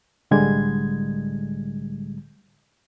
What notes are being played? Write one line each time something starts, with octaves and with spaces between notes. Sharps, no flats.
C2 A2 D3 G3 G#3 G#6